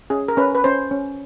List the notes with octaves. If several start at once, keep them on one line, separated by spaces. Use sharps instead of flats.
C#4 G#4
A#4
C#4 B4
B4
C#4 C5
C#4